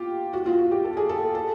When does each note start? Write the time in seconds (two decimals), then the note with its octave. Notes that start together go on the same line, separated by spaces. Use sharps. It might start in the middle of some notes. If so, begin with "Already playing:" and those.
Already playing: F4 G4
0.33 F#4
0.46 F4
0.59 F#4
0.71 G4
0.84 A4
0.97 G#4
1.09 A4
1.35 A4